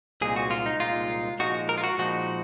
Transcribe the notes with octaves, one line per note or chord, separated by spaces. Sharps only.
C2 A#2 G#3 D#4 G#4
F#4
F4
D#4
C2 A#2 G#3 D#4 F4
A#2 F3 G#3 D#4 F#4
A#4
F4
F#4
A#2 F3 G#3 D#4 F#4